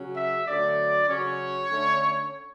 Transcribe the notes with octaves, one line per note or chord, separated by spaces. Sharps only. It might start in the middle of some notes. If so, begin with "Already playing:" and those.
Already playing: C#3 F#3 C#4
E5
D3 F#3 A3 D5
C#3 F#3 C#4 C#5
D3 A3 C#4